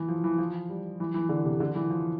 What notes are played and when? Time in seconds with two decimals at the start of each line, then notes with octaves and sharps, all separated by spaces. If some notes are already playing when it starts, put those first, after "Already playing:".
Already playing: E3
0.08 F3
0.24 E3
0.38 F3
0.70 G3
1.00 E3
1.14 E3
1.29 D3
1.45 C3
1.60 D3
1.75 E3
1.90 F3